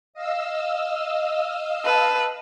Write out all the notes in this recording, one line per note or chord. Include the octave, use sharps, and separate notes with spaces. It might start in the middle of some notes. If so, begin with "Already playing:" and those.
D#5 F5 E6
B4 A5